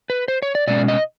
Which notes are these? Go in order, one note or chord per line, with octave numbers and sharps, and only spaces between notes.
B4
C5
C#5
D5
B2 G#3 C#4 D5
D#5